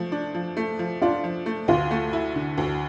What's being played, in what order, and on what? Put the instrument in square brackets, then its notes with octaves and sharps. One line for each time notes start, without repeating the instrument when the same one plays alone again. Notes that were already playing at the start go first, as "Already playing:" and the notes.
Already playing: [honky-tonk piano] F3 A3
D4
F3
A3
F3
[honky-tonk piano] D4 [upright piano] F4
[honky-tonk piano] F3
A3
[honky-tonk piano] D2 [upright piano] F4
[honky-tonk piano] A3
E4
D3
D2